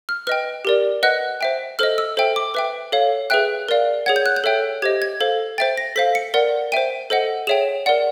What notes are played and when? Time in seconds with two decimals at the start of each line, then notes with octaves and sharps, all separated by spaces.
0.09 F6
0.27 B4 D#5 G5 F6
0.65 G4 A#4 D5
1.03 B4 D#5 F#5 F#6
1.41 C5 E5 G5
1.79 A4 C5 D#5 F6
1.98 E6
2.17 A4 C5 E5 G5
2.36 D6
2.54 B4 E5 G5 D6
2.92 A4 C#5 F5
3.30 G#4 B4 E5 G5 F#6
3.68 A#4 D5 F5
4.06 G#4 C#5 F#5 G#6
4.16 G6
4.26 F#6
4.36 G6
4.44 A4 C#5 E5 G5
4.82 G4 C5 D#5 G#6
5.02 G#6
5.20 A4 C5 F5
5.58 C5 E5 G5 A6
5.78 A#6
5.96 A4 C5 F5 B6
6.15 C#7
6.34 A#4 D5 F#5
6.72 C5 E5 G5 D#7
7.10 A4 C5 D#5 F#5
7.47 G#4 C#5 E5 G5 E7
7.86 A#4 D5 F#5